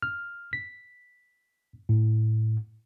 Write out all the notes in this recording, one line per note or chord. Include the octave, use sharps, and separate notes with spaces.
F6
B6
A2